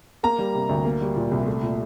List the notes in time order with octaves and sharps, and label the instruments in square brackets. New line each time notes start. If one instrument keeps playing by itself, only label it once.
[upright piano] A#3 A#5
G3
C3
D2
A#3
G3
A#2
C2
A3
A#2